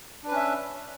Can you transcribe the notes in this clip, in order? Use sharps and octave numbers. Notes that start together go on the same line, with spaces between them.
C#4 D4 B4 E5